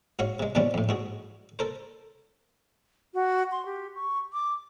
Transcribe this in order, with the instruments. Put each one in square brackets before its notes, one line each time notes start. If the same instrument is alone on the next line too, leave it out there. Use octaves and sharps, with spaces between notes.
[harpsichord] G#2 F#4 C#5 F5
C3 G#3
E2 B2 E3 G3 C4 C#4
F2 A2
G#2 F#4 G#4
A4 A#4 C5
[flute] F#4
C6
G4
C#6
D6